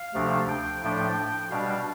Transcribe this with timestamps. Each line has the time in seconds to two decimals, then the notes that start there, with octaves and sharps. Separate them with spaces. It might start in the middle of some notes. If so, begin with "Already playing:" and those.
Already playing: F5
0.14 D2 C3 F3 A3 D4
0.49 G5
0.82 A2 F3 A3 D4 G5
1.50 B2 G3 D4 F5